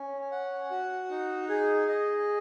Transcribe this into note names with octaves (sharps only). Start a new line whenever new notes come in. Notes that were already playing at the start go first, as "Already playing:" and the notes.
Already playing: C#4
F#5
F#4
D#4
G#4
D#5